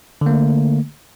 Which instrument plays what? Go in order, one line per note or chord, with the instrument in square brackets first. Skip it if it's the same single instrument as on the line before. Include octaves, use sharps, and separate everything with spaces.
[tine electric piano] D3
A#3
A3